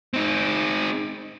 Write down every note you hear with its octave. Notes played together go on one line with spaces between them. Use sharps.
C4 D#4